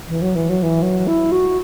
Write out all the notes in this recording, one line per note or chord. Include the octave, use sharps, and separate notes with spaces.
E3
F#3
E3
F#3
E3
F#3
E4
F#4